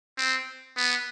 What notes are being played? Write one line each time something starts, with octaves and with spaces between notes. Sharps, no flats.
C4
B3